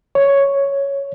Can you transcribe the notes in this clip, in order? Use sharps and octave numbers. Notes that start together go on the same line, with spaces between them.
C#5